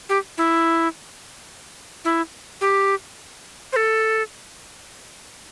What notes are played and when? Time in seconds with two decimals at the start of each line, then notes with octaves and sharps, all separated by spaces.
0.09 G4
0.38 E4
2.05 E4
2.61 G4
3.73 C5
3.76 A4